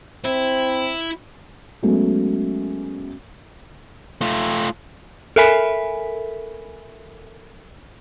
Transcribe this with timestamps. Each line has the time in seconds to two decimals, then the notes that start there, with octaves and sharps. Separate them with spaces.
0.25 C4 E4
1.83 F#3 G#3 A3 B3 C#4
4.21 A3 F4
5.36 A4 A#4 E5 G#5 B5 B6